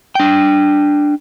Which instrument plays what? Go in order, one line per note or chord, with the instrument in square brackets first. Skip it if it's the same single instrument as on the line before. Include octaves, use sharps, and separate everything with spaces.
[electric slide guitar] D4 G5